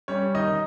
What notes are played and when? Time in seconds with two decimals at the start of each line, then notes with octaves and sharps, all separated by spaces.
0.08 G3 C#4 C#5
0.35 D#3 D#4 D#5